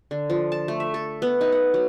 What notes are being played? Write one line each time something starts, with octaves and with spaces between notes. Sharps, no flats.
D3
F3
A5
A3
E5
A4
B3
D#4
F#5
F#3